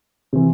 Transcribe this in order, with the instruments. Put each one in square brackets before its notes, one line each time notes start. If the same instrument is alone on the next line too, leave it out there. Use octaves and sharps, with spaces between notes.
[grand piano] C3 E3